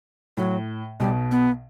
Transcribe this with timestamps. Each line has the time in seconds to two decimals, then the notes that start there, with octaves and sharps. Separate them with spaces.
0.37 A2 F#3
1.00 B1 B2 G3
1.31 B3